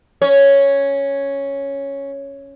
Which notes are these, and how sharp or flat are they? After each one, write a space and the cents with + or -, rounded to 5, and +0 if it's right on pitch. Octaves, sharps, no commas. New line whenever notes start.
C#4 +0 C#5 +0